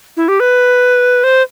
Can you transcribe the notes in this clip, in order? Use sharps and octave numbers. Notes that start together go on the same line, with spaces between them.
E4
G4
B4
C5